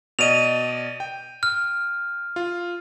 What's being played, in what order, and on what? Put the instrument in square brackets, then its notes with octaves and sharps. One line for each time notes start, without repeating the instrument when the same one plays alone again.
[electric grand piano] B2 D5 D#5 [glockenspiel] D#7 F7
[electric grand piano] G5
[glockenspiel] F6
[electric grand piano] F4